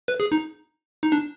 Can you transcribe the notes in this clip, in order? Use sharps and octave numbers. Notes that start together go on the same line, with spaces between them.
B4
G#4
D#4
D#4
D4